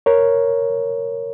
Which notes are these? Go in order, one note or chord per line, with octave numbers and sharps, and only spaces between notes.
A#4 C#5